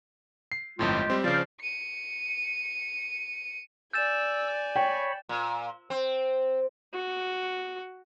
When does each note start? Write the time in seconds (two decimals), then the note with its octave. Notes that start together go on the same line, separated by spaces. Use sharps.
0.52 C7
0.79 G1 F2 A2 G#3 F4 G4
1.10 G3 C4
1.24 C#3 F3 C5 D5 F5
1.61 C#7 D#7
3.93 D5 G#5 E6 G6 A6 E7
4.76 C#5 G5 B5
5.29 A#2
5.90 C4
6.93 F#4